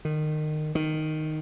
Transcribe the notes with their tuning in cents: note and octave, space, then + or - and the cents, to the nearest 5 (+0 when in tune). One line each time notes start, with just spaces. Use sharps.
D#3 -25
D#3 -5